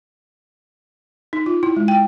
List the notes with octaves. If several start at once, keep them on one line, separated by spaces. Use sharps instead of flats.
D#4
F4
E4
G#3
G5